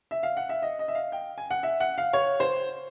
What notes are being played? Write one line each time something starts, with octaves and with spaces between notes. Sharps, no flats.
E5
F5
F#5
E5
D#5
D#5
E5
F5
G5
G#5
F#5
E5
F#5
F5
C#5
C5